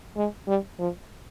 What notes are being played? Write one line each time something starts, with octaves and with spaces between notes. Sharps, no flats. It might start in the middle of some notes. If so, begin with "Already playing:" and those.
G#3
G3
F3